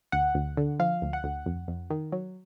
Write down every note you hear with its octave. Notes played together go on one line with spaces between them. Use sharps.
D2 F#5
D2
D3
F3 F5
D2
F#5
D2
F2
F2
D#3
F#3